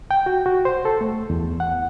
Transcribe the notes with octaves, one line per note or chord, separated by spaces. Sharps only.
G5
F#4
F#4
C5
A4
A3
E2
F#5